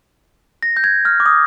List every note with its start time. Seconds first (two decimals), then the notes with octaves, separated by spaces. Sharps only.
0.63 A#6
0.77 G6
0.84 G#6
1.05 F6
1.20 D6
1.26 D#6